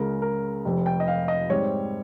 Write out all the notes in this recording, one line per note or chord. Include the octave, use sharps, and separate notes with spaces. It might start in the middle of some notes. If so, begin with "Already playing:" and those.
Already playing: C#2 C#3 G#3 A#4
A#4
F1 F2 C3
G5
D#5
F5
D#5
G#2 G3 C4 C#5